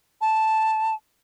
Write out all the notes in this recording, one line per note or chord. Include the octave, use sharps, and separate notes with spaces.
A5